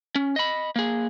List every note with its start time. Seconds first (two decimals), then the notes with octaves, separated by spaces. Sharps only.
0.16 C#4
0.36 D#5 B5
0.76 A#3 G#4